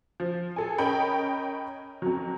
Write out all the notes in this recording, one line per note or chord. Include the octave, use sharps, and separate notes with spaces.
F3
G#4 A4 G#5
C#4 A#4 D#5 G5 B5
F2 F#3